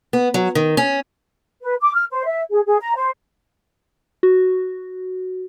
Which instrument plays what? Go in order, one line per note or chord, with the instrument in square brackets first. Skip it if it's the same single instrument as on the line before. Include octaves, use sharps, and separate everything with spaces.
[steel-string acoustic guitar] B3
F#3
D#3
C#4
[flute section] B4
D6
F6
C5
E5
G#4
G#4
A#5
C5
[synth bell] F#4